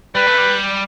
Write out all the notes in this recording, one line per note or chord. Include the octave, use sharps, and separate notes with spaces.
G3 B4
A3
G3